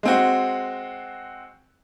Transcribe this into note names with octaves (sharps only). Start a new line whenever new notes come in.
G#3 C4 F#4